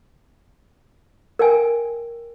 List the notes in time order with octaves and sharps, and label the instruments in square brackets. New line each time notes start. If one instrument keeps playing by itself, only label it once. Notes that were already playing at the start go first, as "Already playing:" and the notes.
[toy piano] A#4 G5 G#5